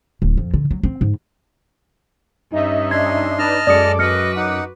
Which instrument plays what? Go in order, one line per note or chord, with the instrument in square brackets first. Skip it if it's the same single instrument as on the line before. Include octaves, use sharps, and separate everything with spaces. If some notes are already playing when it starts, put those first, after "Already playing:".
[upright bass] D1
F2
D3
F#3
C4
G#2
[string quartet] G2 C#4 [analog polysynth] D#4 D#5 E5
[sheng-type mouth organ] D4 C6 [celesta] G#6
[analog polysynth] D4 D#4 B4 [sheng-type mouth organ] D#5 A5 F6
[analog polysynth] F#2 D6 [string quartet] G#3 A4 [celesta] D5 D#6 C#7
[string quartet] F#4 B4 [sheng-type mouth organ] D#5 [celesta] F6 C#7
[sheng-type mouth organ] D#4 F#5